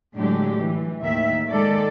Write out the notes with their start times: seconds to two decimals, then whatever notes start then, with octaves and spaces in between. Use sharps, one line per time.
0.15 A2 D3 F#3 G#3 D4 G4
0.56 E3
1.00 D#2 A2 D#3 E5
1.49 D#3 G#3 A4 D5